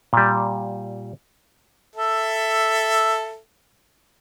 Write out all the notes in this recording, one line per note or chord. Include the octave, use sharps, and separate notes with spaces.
A#2 G3
A4 E5